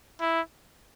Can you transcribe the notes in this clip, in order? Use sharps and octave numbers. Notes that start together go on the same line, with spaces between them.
E4